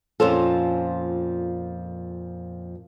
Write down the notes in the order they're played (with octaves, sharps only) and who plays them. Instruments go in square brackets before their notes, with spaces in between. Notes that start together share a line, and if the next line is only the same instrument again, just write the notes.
[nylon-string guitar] F2 A#2 F3 C#4 F4 A4